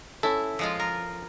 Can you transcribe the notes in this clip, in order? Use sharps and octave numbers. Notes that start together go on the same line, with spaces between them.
C#4 E4 A4
F3 G#3 F4
A#4